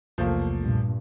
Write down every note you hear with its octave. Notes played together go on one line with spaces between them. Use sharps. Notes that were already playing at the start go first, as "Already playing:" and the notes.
B1 E2 C3 F3 A3 A#3
G2 A#2